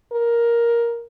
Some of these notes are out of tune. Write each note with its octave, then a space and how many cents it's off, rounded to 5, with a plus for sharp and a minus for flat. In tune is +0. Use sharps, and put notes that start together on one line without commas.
A#4 +10